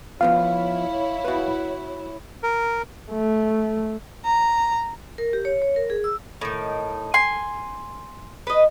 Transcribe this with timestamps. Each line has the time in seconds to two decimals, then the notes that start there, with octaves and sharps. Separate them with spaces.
0.21 F3 B3 E4 F4 C#5 F5
1.24 F#4 B4
2.43 A#4
3.11 A3
4.25 A#5
5.18 A#4
5.33 G4
5.45 C#5
5.62 C#5
5.76 A#4
5.90 G#4
6.04 E6
6.41 A2 D#3
7.14 G#5 C6
8.47 B4 D#5